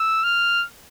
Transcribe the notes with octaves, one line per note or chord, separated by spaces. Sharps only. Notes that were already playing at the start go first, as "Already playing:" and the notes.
Already playing: E6
F6